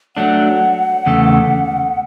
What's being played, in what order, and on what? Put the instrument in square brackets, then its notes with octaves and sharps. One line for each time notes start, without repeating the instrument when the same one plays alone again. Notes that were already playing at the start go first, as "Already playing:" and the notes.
[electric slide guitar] F#3 A3 D4 [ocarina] F#5
[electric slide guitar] E2 C#3 A3